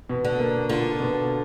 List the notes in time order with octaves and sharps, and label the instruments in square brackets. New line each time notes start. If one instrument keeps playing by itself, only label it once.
[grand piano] B2
[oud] D3
[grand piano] A#3
[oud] D3 [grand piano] F4
[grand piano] B2